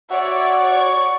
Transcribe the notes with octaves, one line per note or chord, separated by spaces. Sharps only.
F#4 C#5 D5 E5
C#6